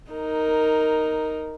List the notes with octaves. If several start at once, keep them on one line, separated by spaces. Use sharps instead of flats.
D#4 A#4